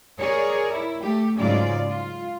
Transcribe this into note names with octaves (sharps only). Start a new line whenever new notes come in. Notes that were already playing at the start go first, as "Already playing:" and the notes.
G#4 A#4 C#5 D5
E4
A3 G4
G#2 C#3 F#3 G#3 F4 D5
F4